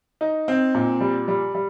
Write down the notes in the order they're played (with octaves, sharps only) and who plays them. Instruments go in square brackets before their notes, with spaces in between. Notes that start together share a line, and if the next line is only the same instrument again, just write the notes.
[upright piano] D#4
C4
A#2
G3
G3
G3